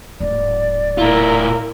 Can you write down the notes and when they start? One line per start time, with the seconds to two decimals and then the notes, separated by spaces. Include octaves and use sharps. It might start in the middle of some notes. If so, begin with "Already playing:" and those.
0.20 D1 G#2 D5
0.98 A2 E4 F4 A#4